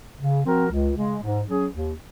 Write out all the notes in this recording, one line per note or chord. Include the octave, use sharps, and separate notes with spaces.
C#3
F3 C4 F#4 A#4
C#2
C#3 G#3
G#2
F#3 C#4 G#4
D#2